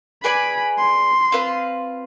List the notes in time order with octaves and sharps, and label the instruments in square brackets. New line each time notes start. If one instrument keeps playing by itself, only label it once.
[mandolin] G#4 B4 D5 G#5 [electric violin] B5
[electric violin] C6
[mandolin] C4 F4 B4 F5